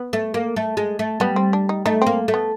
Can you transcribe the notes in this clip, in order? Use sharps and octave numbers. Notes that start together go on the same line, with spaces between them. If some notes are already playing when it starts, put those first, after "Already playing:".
Already playing: B3
A3
A#3
A3
G#3
A3
G3 B3
C4
D4
D#4
A3 D#4
A#3 C4
A3
B3